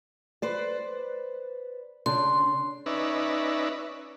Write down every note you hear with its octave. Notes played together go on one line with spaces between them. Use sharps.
B4 C5 D5
C#3 D4 C6
C#4 D#4 B4 D5 E5